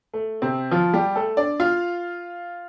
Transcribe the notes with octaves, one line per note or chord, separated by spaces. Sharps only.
A3
C3 C4
F3 F4
G3 G4
A3 A4
D4 D5
F4 F5